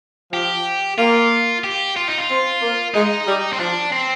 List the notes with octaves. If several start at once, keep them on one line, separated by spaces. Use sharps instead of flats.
F3 G4
A#3 F4
G4
F4
D#4
F4
C4
A#3
G#3 D#4
G3
C4
F3 D4
C4